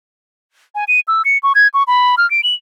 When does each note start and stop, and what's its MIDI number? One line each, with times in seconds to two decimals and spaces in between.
0.75 0.84 80
0.88 1.00 99
1.08 1.22 88
1.25 1.38 97
1.43 1.53 85
1.55 1.68 92
1.74 1.83 85
1.87 2.15 83
2.18 2.29 89
2.31 2.41 98
2.44 2.55 102